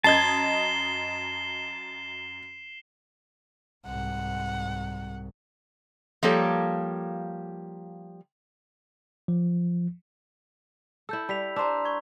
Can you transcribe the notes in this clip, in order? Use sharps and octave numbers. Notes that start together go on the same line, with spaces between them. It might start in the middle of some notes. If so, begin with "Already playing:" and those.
F#2 D#5 A5 G#6 C7 E7 G7
C2 G#2 F#5
F3 G3 A#3 G4 A4 C#5
F3
E4 A4 E6 G6
G3 B5 B6 F7
D4 C5 A#5 C6 E6
C#6 G#6